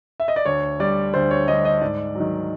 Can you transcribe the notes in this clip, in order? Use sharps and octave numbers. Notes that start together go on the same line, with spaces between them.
E5
D#5
D5
D2 C#5
D3 G3 D5
D2 C5
C#5
D3 G3 D#5
D#5
G#2 D5
D#3 F#3